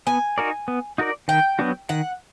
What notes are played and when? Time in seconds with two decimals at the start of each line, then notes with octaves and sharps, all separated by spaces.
0.07 B3 G#5
0.38 D#4 F#4 A#4 D5
0.68 B3
0.98 D#4 F#4 A#4 D5
1.28 D#3 G5
1.59 F#3 B3 D4 F#4
1.89 D#3 F#5